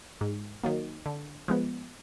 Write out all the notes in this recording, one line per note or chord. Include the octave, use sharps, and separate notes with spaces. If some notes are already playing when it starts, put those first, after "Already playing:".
G#2
D#3 F#3 A#3
D3
F3 G#3 B3